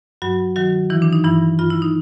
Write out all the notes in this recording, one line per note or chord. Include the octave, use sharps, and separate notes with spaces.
G2 F#3 F#4
D#3 F#3 F#4
D#3 E3 E4
D4
D#4
G2 E3 E4
G2 F4
E4
D#4